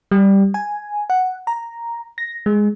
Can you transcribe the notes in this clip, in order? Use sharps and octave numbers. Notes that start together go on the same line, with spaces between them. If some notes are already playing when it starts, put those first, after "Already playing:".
G3
G#5
F#5
A#5
A#6
G#3